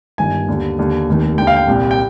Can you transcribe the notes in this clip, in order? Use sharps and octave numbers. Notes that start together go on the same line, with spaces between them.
G1 G2 D#3 G#5
D#2 D3
D#2 D3
F1 D#2 D#3
D#2 D3 G5
F5
G5
C2 A#2
G5